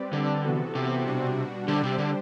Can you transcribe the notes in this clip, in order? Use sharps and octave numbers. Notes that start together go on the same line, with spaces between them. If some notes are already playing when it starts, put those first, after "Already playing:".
Already playing: G3 C4 G4 B4 D5
D3
C3 E3 B3 F#4 A4
C3
B2 G3 D4 F#4
D3 G3 D4 G4 C5
C3
D3